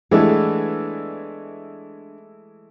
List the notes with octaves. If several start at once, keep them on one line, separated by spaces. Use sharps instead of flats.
E3 G#3 A3 B3 D4 G4